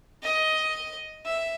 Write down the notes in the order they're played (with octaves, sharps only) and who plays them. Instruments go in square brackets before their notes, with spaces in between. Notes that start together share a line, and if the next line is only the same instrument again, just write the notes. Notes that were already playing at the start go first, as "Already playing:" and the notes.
[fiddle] D#5
E5